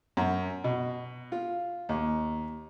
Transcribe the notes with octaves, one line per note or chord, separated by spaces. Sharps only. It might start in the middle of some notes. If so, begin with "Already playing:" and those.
F#2
B2
F4
D#2